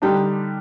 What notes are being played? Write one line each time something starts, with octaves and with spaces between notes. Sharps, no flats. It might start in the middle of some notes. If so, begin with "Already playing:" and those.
D3 G3 D4 D#4 G4